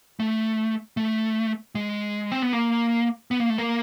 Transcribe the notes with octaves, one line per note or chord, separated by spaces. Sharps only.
A3
A3
G#3
C4
B3
A#3
B3
A#3
A3
A#3